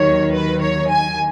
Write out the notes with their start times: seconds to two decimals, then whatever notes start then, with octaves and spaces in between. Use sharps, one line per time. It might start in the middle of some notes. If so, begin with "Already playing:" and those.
Already playing: D#2 D#3 F#3 C#5
0.33 B4
0.62 C#5
0.90 G#5